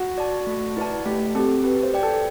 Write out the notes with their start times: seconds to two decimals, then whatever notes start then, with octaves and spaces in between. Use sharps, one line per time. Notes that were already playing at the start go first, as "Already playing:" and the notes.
Already playing: F#4
0.18 D5 A5
0.47 A3
0.77 E4 B4 D5 A5
1.05 A3 G4
1.35 C4 G4 A4
1.64 G4 B4
1.83 C5
1.94 D5 G5
2.03 A4